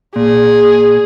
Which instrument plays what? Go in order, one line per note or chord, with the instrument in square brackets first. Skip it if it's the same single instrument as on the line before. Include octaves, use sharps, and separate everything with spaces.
[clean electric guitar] A#2 [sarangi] G#4